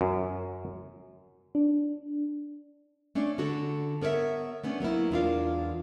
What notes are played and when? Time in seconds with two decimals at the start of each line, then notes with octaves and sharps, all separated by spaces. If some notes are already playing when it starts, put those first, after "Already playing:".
0.01 F#2
1.55 D4
3.15 A3 C#4 D4
3.38 D3 F#4 A4
4.01 B3 A#4 C#5 D5 E5
4.64 A3 B3 C#4 D4
4.80 F#3 A#3 B3 E4
5.11 E2 G#3 D4 F4 A#4 F5